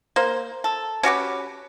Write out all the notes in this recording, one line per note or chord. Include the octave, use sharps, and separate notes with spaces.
A#3 C5
A4
C#4 F#4 G4 B4